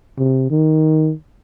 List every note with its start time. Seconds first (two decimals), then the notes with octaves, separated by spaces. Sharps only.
0.18 C3
0.51 D#3